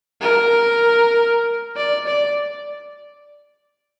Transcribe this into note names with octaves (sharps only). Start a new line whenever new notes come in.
A#4
D5
D5